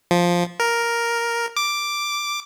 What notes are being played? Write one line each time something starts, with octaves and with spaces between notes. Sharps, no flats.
F3
A#4
D6